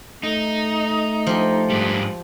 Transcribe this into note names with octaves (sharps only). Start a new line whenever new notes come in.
A3 D#4
F3 G4
G#2 G3